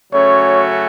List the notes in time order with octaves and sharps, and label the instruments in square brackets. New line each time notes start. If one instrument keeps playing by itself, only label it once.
[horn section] C#3 F#3 A3 C#4 F#4 [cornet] C#5